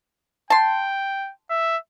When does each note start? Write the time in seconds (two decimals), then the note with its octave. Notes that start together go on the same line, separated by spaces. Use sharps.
0.50 G5 A5 C6
1.50 E5